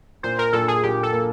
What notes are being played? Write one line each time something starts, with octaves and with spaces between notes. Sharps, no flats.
A#2 C5
A#4
A#2 A4
G#4
A#2 G4
A4
A#3